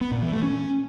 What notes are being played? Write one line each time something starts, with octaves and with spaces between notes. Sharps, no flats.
B3
A#2
E3
A3
C#4